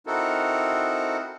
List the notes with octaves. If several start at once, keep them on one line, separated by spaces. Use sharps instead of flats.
C4 D#4 E4 F#4 A4 A#4